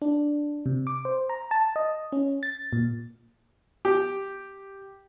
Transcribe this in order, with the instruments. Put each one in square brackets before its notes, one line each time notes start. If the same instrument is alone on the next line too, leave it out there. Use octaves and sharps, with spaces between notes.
[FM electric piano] D4
C3
D6
C5
A#5
A5
D#5
C#4
A6
A#2
[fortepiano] G4